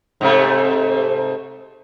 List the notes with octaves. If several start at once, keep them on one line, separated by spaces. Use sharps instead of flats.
G#2 C3 A3